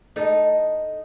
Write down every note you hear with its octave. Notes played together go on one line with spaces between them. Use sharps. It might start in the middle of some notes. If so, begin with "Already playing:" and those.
D#4 A4 D#5